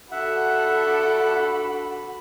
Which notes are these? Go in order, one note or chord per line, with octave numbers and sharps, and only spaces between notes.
D4 F#4 A4 E5 F#5 B5